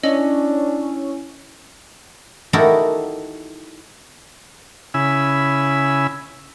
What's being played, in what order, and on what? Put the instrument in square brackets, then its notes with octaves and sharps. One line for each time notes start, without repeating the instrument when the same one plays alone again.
[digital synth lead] C#4 [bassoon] D4 [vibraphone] E4 [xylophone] D#5
[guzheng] D#4 E4 F#4 G4 A4 A#4
[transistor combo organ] C#3 E4 G#5 B5 E6